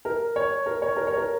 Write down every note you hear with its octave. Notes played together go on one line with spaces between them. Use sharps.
A#4
C#5
A#4
C#5
A#4
C#5
A#4